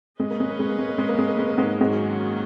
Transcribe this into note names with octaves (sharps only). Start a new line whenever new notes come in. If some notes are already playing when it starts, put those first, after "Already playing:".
G#3 C#4 G#4 B4 D#5
A#3
G#3
A#3
G#3
A#3
G#3
A#3
G#3
A#3
G#3
A#3
G#3
A#3
G#2 G#3
G#2 D#3 F#3 G#3 A#3 C#4 G#4